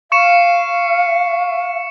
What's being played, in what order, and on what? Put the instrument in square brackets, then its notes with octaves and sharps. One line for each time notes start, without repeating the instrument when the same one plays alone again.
[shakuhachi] F5 [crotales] C#6 C#7 E7